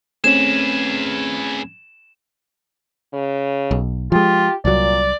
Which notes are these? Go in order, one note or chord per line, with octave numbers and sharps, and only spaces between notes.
A3 C4 C#4 G#4 B4 E7
C#3
B1
F3 G#3 F4 G4
C2 A#2 F#3 D5